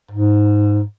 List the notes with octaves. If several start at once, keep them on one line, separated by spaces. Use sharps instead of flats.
G#2